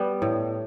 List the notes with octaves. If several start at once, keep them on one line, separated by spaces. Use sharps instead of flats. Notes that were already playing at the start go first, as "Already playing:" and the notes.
Already playing: G3 B3
A2